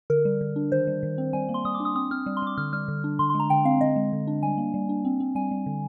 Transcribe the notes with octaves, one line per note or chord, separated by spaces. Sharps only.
D3 A#4
G3
D3
D4
D#3 C5
G3
D#3
C4
G3 G#5
A#3
C6
G3 D#6
D6
D4
D#6
C4 D#6
C4 F6
G3
C6
G3 D6
D3 F6
G3 F6
D3
D4
D3 C6
C6
G#3
A#5
D3 G5
C4 F5
D3 D#5
G#3
D3
D4
G3 G#5
A#3
G3
D4
C4
C4
G3 G#5
G3
D3